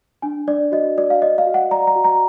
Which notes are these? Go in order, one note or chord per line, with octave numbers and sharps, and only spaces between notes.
D4 G#5
D4 D5
F#4 D#5
F#4 D5
F5
D5 D#5
F5
F#4
F#5
D5 A#5
A#5
F#4
A#5